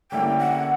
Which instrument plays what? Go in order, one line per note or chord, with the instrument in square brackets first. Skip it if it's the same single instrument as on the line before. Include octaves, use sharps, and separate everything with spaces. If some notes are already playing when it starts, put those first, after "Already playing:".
[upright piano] D3 G3 A#3 C#4 E4 [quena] G5
[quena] F#5